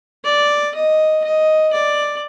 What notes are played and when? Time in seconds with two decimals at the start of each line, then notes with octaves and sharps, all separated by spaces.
0.24 D5
0.74 D#5
1.24 D#5
1.73 D5